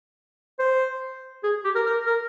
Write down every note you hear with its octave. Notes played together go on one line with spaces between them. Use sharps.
C5
G#4
G4
A#4
A#4
A#4